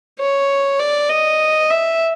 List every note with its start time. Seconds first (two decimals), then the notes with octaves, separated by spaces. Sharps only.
0.19 C#5
0.79 D5
1.10 D#5
1.70 E5